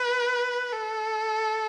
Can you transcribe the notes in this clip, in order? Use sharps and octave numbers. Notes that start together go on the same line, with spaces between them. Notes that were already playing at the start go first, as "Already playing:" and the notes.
Already playing: B4
A4